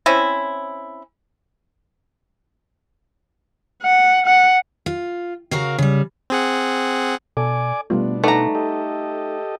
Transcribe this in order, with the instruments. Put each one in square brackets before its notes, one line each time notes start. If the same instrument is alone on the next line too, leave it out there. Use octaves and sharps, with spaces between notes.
[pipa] C4 C#4 E4
[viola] F#5
F#5
[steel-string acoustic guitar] F4
C#3 F#4 A#4 F5
C#3 G3
[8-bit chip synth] C4 G#4 F#5
[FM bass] B2 [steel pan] A4 [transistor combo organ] D5 G#5 D6
[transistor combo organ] B2 D4 [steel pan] G3 A3 F4 [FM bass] B3
[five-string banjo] A3 A#5 [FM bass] D#4 [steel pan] B4 D5 F#5
[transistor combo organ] G4 A4 D#5